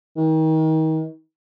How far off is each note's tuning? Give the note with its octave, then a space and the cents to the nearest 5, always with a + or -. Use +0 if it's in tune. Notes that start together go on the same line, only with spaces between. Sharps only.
D#3 +30